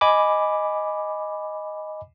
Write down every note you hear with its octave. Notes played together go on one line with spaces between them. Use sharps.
D#5 G#5 B5 D6